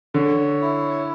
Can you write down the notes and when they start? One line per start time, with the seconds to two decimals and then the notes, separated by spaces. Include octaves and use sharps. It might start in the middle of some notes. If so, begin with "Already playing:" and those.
0.14 D3 C#5
0.61 E4